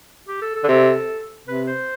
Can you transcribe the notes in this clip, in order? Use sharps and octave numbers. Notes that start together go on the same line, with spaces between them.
G4
A4
A4
D3
C3
C3 B4
C5